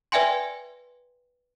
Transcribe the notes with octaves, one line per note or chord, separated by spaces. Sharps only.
B4 D5 E5 G5 G#5 C6